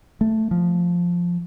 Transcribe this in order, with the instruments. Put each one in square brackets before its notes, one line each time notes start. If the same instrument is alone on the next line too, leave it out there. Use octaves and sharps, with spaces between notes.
[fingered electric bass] A3
F3